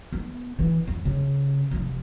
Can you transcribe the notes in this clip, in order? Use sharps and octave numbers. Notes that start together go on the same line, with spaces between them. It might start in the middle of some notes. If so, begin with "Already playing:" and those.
B3
E3
F2
C#3
F1 F3